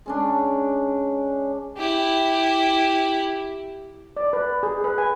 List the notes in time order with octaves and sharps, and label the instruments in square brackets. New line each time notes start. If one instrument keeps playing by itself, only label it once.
[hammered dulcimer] G#3 C#4 D4
[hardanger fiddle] E4 G4
[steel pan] D5
B4
G#4
B4
G#5